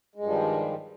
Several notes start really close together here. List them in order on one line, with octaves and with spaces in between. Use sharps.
G#3 G2 F3 G3 D#3